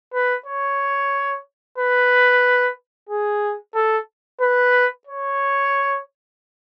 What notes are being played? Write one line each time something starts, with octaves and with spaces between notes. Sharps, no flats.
B4
C#5
B4
G#4
A4
B4
C#5